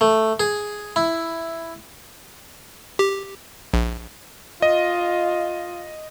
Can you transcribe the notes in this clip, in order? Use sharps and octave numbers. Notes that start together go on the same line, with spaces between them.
A3
G#4
E4
G4
A#1
F4 D#5